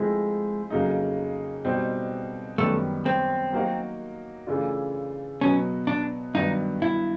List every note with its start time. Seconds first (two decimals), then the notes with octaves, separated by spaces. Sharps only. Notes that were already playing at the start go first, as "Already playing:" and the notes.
Already playing: F3 G#3 A3 C4 E4 G#4
0.70 F2 C#3 F#3 A#3 D#4
1.65 B2 G3 C4 D#4
2.58 F#2 D#3 G3 A3 B3
3.06 C4
3.52 F#3 A#3 D#4 F#4 A#4
4.47 C#3 E3 A3 D4 F4
5.41 B2 F#3 B3 C#4
5.87 D4
6.34 G2 D#3 F#3 B3 D4 D#4
6.82 E4